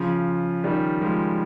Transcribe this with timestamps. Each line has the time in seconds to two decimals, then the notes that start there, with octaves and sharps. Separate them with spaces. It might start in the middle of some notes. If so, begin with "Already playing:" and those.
Already playing: C#3 F3
0.64 D#3 G3
1.01 F3 G#3